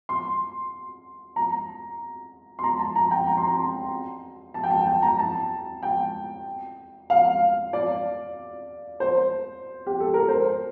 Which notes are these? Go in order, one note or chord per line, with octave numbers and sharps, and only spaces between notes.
C6
A#5
C6
A#5
A5
A#5
G5
A#5
C6
A#5
A5
G5
A5
G5
A#5
A5
G5
F5
D5
C5
G4
A4
A#4
C5